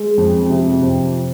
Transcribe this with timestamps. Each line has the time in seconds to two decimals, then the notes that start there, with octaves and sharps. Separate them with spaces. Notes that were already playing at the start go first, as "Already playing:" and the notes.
Already playing: G#3
0.18 F2
0.50 C3
0.82 F2